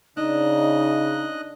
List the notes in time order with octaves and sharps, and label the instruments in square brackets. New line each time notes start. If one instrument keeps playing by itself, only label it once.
[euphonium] C#3 [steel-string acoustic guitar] D4 [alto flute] D#4 [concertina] D#5 F#6